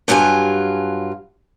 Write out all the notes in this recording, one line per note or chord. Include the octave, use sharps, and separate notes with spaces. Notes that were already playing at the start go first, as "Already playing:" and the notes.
G2 F#3 F4 G#4 G#5